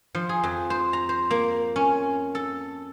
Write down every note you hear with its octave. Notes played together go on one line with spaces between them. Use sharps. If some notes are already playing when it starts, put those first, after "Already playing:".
F3
G#4
F2
C5
A#5
C5
A#3
C#4
A4